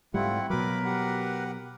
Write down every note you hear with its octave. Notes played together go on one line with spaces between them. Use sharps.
G#2 G3 A3 C4 E4 F4 F#5
B2 F#3 A#4 B4 B5 D6
G4 F#5